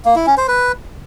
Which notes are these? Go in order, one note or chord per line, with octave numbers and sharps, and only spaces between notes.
A#3
E4
C#4
C5
B4